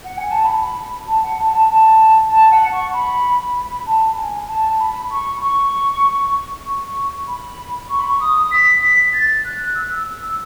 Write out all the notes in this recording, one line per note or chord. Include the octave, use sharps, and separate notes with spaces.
F#5
G#5
A5
B5
A5
F#5
A5
A5
A5
A5
F#5
C#6
B5
B5
A5
G#5
A5
B5
C#6
C#6
C#6
B5
C#6
B5
C#6
D#6
B6
B6
A6
F#6
E6
E6